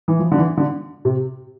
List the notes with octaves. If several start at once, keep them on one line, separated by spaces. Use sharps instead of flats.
E3
F3
D3
E3
D3
C3